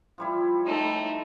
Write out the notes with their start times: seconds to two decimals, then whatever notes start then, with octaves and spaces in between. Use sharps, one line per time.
0.18 F3 G3 E4
0.65 A3 D#4